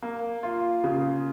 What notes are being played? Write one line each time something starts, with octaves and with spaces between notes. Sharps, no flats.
A#3
F4
C#3